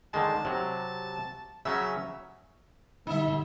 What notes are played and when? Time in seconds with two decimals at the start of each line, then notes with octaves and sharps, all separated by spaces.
0.14 D3 D#3 G#3 A5
0.45 C3 F#3
1.65 C#3 F#3 C#4 E5
3.07 D3 G3 D#4 E5